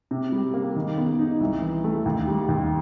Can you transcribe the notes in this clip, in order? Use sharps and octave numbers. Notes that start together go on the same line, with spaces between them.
C3
G3
A#3
D#3
B3
D#4
C2
E3
A3
D#2
G3
D#2